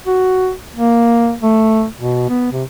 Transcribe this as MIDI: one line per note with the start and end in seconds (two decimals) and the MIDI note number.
0.07 0.52 66
0.76 1.33 58
1.43 1.86 57
2.00 2.29 47
2.29 2.48 59
2.52 2.63 48